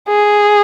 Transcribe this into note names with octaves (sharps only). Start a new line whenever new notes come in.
G#4